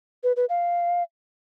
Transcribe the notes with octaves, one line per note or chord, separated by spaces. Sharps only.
B4
B4
F5